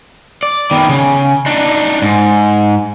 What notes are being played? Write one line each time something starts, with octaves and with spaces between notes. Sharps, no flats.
D5
D#3 B3
C#3
D4 D#4
G#2